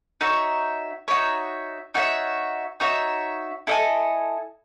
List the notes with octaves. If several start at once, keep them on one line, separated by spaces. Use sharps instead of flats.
D#4 F#4 C#5 E5
D#4 F#4 C#5 E5
D#4 F#4 C#5 E5
D#4 F#4 C#5 E5
E4 A4 D#5 G#5